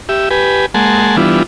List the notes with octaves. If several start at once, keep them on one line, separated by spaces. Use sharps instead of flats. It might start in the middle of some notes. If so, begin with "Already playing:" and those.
G4 E5
G4 B4 G#5
G#3 A#3 F#5 G#5 A5 C6
E3 G3 B3 D4 E4 F4